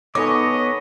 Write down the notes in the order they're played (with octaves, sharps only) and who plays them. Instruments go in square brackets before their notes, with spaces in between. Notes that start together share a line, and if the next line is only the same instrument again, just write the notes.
[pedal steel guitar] B3 D6 [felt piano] D#4 A4 G#5 [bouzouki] C#5 [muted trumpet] D#5